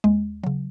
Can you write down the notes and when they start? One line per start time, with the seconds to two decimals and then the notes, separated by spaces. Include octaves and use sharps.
0.04 D#2 G#3
0.44 C#3 F#3